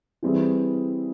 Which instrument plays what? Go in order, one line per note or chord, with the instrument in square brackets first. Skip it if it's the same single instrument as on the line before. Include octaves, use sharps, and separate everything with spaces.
[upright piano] E3 G3 C4 E4 G#4